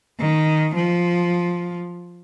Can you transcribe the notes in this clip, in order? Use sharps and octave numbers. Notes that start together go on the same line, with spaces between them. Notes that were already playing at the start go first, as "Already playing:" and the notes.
D#3
F3